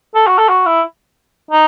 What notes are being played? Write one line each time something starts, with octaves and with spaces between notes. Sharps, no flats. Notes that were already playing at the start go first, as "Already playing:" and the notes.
A4
F#4
A4
F#4
E4
D#4